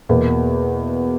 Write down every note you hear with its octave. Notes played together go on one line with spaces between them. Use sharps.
E2 B2 A#3